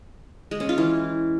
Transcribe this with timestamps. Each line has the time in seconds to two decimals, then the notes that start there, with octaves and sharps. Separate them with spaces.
0.51 G#3
0.60 C#4
0.69 F4
0.78 E3